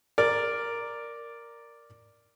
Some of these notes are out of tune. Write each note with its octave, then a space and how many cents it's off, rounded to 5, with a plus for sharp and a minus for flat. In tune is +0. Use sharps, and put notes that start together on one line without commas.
A#4 +0 D5 +0